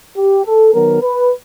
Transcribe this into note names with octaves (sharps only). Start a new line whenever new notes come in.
G4
A4
D#3 F#3 B3 A#4
B4